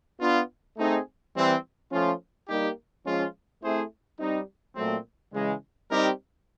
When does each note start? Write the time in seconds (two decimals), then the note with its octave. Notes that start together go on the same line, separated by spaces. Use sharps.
0.20 B3 D4 F4
0.77 A3 C4 D#4 G#4
1.34 E3 G3 C4
1.91 F3 A3 C#4 F4
2.48 G3 A#3 D#4 G4
3.05 F3 G#3 C#4 F4
3.63 A3 C4 E4 G#4 C5
4.19 G3 C4 D#4
4.76 A#2 F#3 A3 C4
5.33 C#3 E3 G#3
5.90 G3 C4 D#4 G4 A#4